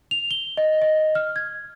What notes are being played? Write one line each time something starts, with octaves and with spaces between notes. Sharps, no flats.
F7
G7
D#5
D#5
F6
G#6